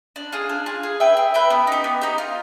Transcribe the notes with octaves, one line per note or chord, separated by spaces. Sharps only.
D4
F4 G#4
D4
F4 G#4
G#4
B4 E5 G5
G#4
B4 E5 G5
B3
D#4 G4
B3
D#4 G4
F4